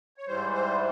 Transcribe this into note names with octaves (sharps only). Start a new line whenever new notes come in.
C#5
G#2 E3 G3 C5
C5